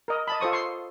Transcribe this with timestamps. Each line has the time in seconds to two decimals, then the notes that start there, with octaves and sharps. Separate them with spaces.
0.08 A#4 D#5
0.28 D#5 A5 B5
0.40 F4 A4 C5 C#6 D#6
0.52 C6 C#6